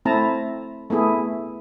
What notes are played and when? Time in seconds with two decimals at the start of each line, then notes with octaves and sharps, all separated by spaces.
0.05 A3 C4 E4 A5 A#5
0.90 A3 B3 E4 G#4